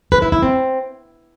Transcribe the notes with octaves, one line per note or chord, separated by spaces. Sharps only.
B4
E4
E4
C4